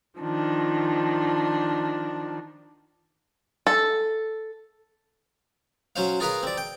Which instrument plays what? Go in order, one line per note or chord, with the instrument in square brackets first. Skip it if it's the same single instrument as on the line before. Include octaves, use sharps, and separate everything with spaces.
[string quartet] D#3 F3 D4
[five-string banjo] A4
[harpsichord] F#3 C#4 C5 F5
F4 G#4 A#4 B4 F5
C4 D5
G5